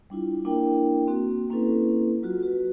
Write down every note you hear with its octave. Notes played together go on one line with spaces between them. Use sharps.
G3 D4 E4 F4
A#3 D4 E4 A#4 G5
A#3 C4 F#4
A#3 C4 C#4 E4 A4 B4
F#3 F4 F#4
F#4 B4